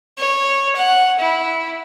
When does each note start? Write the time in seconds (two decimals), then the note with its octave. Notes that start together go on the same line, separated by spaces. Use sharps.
0.18 C#5
0.76 F#5
1.19 E4